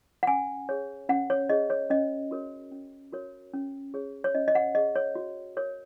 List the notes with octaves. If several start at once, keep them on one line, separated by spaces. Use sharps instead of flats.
F#5
C#4 G#5
G#4 C#5
C#4 F#5
C#5
G#4 C#5 D#5
C#5
C#4 D#5
F#4 A#4 C#5
C#4
F#4 A#4 C#5
C#4
G#4 C#5
C#5
C#4 D#5
D#5
F#5
G#4 C#5 D#5
C#5
F#4
A#4 C#5